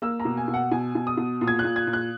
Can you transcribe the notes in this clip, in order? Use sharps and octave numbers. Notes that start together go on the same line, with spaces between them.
A#3 E6
A#5
B2
G#5
B2
F#5
B2 G#5
B2
D#6
B2
A#2
G#6
A#2 F#6
G#6
A#2
F#6